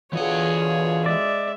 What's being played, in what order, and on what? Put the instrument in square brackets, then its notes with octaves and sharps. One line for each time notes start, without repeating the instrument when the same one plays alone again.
[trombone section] B2 D3 F4 [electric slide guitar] E3 F#5 [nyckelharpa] G#4 C#5
[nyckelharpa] G#3 E5 [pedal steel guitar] D5